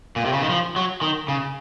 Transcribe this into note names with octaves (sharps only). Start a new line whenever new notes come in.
A#2
C3
C#3
D#3
F3
F#3
D#3
C#3